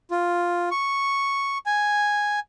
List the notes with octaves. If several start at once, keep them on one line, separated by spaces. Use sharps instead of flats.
F4
C#6
G#5